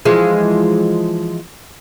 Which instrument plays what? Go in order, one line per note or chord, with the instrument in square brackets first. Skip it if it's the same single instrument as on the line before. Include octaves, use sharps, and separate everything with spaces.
[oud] E3 F3 G#3